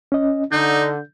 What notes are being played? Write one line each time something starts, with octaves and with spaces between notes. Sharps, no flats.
C#4 D#5
D3 D#4 G6